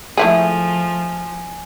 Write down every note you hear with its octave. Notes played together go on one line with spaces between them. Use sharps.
F3 A3 E4 G#4 G#5